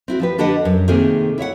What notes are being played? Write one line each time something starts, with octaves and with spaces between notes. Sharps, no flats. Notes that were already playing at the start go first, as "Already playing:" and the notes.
C4 E4 F#4
F3 G4 B4
D3 D4 G4 B4 D#5 F#5
F#2
C3 D#3 A3 A#3 C4 G#4
E4 C#5 E5 F#5